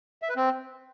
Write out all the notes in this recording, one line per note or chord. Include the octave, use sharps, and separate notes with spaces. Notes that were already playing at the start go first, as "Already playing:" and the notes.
E5
B4
C4